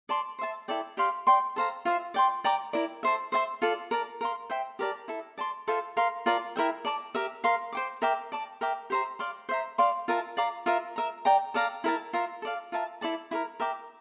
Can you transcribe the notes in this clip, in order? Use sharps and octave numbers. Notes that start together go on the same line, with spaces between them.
D5 A5 C6
C5 E5 A5
E4 A4 D5 G5
G4 D5 F5 C6
D5 G5 C6
A4 C5 F5 A#5
F4 C5 E5
D5 G5 C6
D5 G5 A#5 D6
E4 A#4 D5
A4 C5 E5
C5 E5 A5 C6
F4 A4 D5
A#4 D5 A5
A#4 F5 C6
C5 E5 G5
G4 A#4 D5 A5
E4 A4 E5
D5 A5 C6
F4 A4 C5 E5
A#4 F5 C6
F4 A#4 D5 A5
E4 A#4 E5 G5
D5 A5 D6
G4 A#4 E5
A#4 F5 C6
C5 G5 D6
A#4 E5 G5 D6
D5 A5 D6
A#4 E5 G5 D6
G4 C5 E5 A#5
D5 F5 C6
C5 E5 A#5
D5 F5 C6
F4 A#4 E5 A5
D5 F5 A#5 D6
F4 A#4 E5
A#4 E5 A#5
D5 G5 A#5
A4 D5 F5 A#5
E4 A#4 E5 A5
F4 A#4 E5 A#5
A4 D5 F5
F4 A#4 E5 A5
E4 A4 D5 A5
E4 G4 A#4
A#4 E5 G5 D6